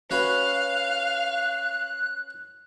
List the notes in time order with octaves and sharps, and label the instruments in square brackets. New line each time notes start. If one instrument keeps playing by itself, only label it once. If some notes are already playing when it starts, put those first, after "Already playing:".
[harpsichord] C#4 F#4 B4 [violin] F5 [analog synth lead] F#6